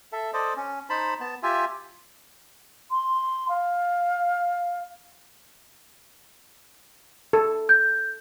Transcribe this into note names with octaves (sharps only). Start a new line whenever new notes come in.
A4 E5
A4 C5 D5 D#5
C#4
D#4 C5 A5 B5
B3 A5
F4 G4 E5 G#5
C6
F5
A4
G6